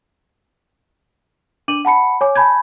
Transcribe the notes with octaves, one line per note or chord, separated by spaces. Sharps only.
D4 D6 D#7 F#7
F#5 A5 B5 C#7
C#5 G#5 D6
G#5 A5 B5 G6 G#6